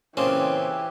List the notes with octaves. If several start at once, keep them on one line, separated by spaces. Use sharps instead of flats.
A#2 C#3 E3 C4 C#4 G4